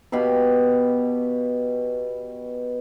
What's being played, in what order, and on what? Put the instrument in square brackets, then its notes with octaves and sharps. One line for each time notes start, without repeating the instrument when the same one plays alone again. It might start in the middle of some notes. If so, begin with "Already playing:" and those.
[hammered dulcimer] B2 G4 F5 B5